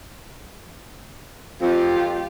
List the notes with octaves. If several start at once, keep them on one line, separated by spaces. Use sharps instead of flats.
F2 F4 G4